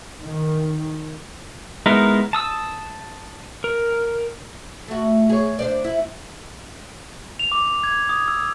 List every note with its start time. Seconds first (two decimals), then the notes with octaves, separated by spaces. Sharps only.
0.22 D#3
1.86 G#3 B3 D#4 E4 A#4
2.33 A5 D#6 E6
3.64 A#4
4.88 A3 F#4
5.29 G#4 C#5
5.59 D4 C5 D5
5.84 E4
7.39 F7
7.52 D6
7.83 G#6
8.09 D#6
8.28 E6